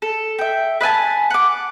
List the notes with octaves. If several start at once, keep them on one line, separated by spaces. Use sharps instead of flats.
A4
E5 G5
B4 E5 G#5 A5
F#5 D6